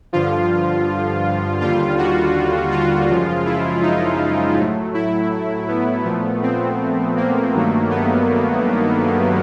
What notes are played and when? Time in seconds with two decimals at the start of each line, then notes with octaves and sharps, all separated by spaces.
0.13 G2 D3 F3 F4
1.60 D#2 D3 G3 F4
1.98 F#4
2.71 F4
3.09 F#2 C#3 F3 G#3
3.46 E4
3.82 D#4
4.57 A2 F#3 A3
4.94 E4
5.68 B3
6.05 A#2 F3 A3
6.43 C4
7.17 A#3
7.54 G2 D#3 F#3 A3
7.90 B3